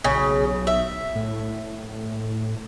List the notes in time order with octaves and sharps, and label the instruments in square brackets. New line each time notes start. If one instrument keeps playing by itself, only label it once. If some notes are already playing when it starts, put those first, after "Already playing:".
[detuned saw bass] B1 [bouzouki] C#3
[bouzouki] E5
[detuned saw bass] A2